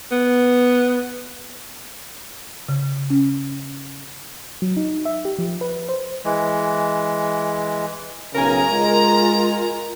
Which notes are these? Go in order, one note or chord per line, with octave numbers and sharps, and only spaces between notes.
B3
C#3
C#4
F#3
D#4
E5
G4
F3
B4
C5
E3 G#3
B1 C#3 A#4 G#5 A#5
G#3 F4